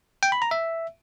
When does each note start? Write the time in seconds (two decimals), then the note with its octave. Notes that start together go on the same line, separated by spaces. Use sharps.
0.23 G5
0.32 B5
0.42 A#5
0.51 E5